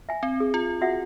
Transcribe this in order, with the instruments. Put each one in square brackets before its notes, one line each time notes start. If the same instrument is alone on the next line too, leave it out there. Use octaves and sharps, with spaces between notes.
[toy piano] E5 G#5
[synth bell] C4
[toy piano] G#4
[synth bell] F4
[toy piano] F#4 E5 F#5